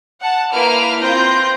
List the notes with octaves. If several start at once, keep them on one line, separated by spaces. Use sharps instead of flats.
F#5 A5
A#3 E4 B4 F5 F6 D7
C4 F4 G6 A#6